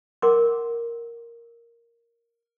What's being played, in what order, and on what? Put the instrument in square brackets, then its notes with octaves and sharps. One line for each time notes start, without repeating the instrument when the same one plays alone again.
[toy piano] A#4 F#5 C6 D6